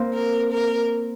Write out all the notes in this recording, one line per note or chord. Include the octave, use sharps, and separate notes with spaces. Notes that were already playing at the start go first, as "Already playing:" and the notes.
Already playing: A#3 C4
A#4
A#4